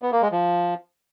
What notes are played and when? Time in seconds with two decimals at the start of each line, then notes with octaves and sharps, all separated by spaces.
0.02 B3
0.12 A#3
0.22 G#3
0.32 F3